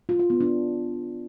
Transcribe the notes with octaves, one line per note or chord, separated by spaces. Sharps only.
F4
F4
B3
D4